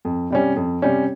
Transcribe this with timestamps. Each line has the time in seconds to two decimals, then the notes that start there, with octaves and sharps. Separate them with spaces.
0.05 F2
0.31 C3 G3 C#4
0.56 F2
0.82 C3 G3 C#4